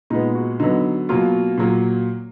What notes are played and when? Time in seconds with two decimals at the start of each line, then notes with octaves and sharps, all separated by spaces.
0.10 A#2 G#3 B3 D#4
0.35 F#4
0.60 D3 F#3 B3 D#4
1.09 B2 F#3 A#3 F4
1.58 A#2 F#3 A#3